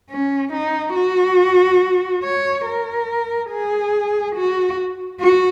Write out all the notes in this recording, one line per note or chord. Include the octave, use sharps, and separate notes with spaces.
C#4
D#4
F#4
C#5
A#4
G#4
F#4
F#4